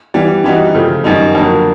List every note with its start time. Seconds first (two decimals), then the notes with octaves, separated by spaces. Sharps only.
0.14 E3 G3 B3
0.44 E3 G3 B3 D#4 F#4
0.75 C#3 F3 A3
1.04 F#2 D#3 G3 B3 D#4
1.35 F2 D3 F#3 A#3